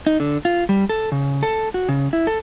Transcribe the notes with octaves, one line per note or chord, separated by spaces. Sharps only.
D#4
D3
F4
G3
A4
C#3
A4
F#4
C#3
E4
A4